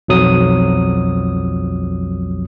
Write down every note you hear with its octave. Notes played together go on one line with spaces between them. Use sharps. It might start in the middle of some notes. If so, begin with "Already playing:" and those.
B1 F2 F#3 D#6